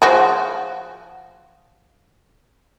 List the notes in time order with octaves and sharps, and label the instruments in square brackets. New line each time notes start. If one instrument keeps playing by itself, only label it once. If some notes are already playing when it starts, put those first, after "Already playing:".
[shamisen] F3 F#4 G#4